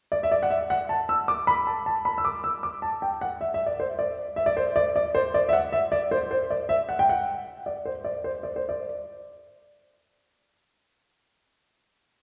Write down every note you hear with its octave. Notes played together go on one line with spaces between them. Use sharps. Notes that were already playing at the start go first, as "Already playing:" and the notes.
D5
E5
D5
F#5
E5
F#5
A5
E6
D6
B5
A5
A5
B5
E6
D6
E6
D6
A5
G5
F#5
E5
E5
D5
C5
D5
E5
D5
C5
D5
D5
C5
D5
E5
F#5
E5
D5
C5
C5
D5
E5
F#5
G5
F#5
D5
C5
D5
C5
D5
C5
D5